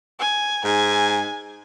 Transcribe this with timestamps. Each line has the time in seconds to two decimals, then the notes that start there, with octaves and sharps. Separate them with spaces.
0.20 G#5
0.64 G#2 G#5